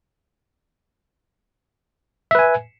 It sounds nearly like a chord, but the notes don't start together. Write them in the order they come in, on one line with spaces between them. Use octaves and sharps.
E5 B4 G#5